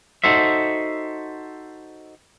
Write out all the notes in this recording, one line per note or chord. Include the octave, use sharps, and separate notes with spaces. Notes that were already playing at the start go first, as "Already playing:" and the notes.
D#4 F#4 A4 C5 E5